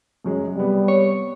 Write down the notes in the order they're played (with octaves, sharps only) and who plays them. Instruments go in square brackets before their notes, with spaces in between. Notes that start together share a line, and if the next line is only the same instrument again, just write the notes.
[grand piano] F#2 F#3 G#3
[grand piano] C3 B3 [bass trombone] G3
[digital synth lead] C#5